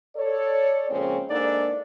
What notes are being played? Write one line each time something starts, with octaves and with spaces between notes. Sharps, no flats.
A4 C#5 D5
F2 A#2 C#3 G#3 C4 C#4
G#2 A#3 D4 D#4 A4 D5